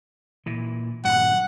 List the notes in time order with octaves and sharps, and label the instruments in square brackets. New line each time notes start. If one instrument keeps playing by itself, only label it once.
[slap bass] A#2 E3
[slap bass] D#1 G2 F#3 [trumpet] F#5